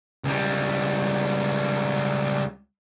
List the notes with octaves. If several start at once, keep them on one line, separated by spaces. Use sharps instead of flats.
C#2 G3